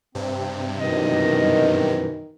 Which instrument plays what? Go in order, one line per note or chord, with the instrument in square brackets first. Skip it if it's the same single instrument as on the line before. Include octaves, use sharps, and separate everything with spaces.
[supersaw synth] G2 C3 [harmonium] C4
[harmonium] F#2 B2 E3 [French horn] D#3 [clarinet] D#5